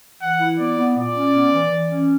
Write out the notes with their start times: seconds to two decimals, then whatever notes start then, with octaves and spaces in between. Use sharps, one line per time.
0.22 E3 F#5
0.40 E4
0.59 B3 D5
0.78 B3
0.97 A#2 D5
1.15 C#4
1.34 B3
1.53 E3
1.71 E3
1.90 C#4